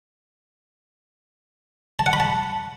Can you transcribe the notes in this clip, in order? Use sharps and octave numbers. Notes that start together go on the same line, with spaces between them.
A5
F#5
B5
A5